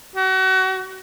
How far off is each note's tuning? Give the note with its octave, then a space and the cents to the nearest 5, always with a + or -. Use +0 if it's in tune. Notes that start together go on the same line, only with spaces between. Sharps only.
F#4 +35